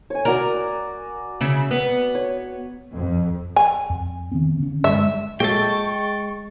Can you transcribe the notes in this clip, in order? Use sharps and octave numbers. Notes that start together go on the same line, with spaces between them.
C#5 G#5
F#4 A#4 D5 A#5
C#3 E4
B3
C#5
F2
G#5
F2
D#3 B3 C4
D3 C#4
G2 G#3 E5
A#2 F#3 G#3 A3 G5 A5 C#6